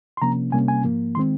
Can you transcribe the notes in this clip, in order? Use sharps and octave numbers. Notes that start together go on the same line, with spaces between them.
C6
C3 F3 A#3 C#4 A#5
C3 G3 A#3 C#4 G#5
G#5
G#2 F3 A#3
D#3 G#3 C4 C6